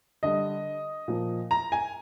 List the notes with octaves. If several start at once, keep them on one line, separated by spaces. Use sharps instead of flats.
D3 G3 D#5
A#2 F3
A#5
G#5